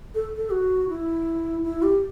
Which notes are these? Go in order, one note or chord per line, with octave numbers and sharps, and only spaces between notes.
A4
A4
F#4
E4
E4
G4